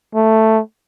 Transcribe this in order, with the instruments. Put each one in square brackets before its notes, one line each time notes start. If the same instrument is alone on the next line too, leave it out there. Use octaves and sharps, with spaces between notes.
[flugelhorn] A3